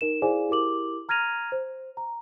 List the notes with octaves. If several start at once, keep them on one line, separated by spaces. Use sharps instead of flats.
D#4 A#4 E7
E4 G#4 C5 D5 F5 G#5
E4 G4 A#4 D6 F#7
A#5 F6 G#6 A#6 D#7 F7
C5
A#5